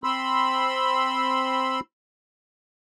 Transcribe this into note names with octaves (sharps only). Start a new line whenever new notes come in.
C4 B5 C6 E6